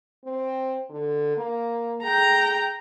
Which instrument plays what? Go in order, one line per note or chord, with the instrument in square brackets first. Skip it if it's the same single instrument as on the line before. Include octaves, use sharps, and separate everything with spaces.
[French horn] C4
D3
A#3
[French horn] G#4 [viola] G5 A#5